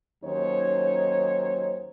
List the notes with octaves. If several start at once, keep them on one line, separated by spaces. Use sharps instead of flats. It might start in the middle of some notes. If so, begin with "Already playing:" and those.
D#2 F#3 C#4 D#4 C5 C#5